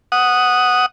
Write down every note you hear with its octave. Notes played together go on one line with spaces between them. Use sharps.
F#5 D#6